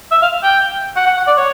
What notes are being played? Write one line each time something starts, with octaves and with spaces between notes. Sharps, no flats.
E5
F5
G5
F#5
F#5
F#5
D5
C#5